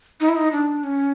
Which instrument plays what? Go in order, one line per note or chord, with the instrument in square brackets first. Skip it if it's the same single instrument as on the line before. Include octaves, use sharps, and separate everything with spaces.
[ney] D#4
E4
D#4
D4
C#4